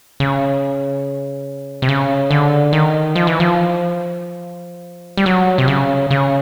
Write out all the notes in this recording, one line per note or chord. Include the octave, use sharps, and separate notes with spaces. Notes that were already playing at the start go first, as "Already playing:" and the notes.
C#3
C3
C#3
D3
D#3
F3
E3
F3
G3
F#3
C3
C#3
C#3